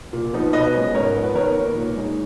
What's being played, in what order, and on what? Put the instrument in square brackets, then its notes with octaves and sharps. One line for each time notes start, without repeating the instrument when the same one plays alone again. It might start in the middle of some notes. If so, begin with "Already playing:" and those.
[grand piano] A#2
F3 B3 D#4
B2 B4 D#5
G#3 C#4
G#2 A#4 C#5
F3 B3
B4
D#3 A#4 C#5
A#3 D#4
A#2
G#3 D#4